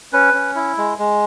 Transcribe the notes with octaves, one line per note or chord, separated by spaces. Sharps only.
C#4 B4
C#4
E4
G#3
G#3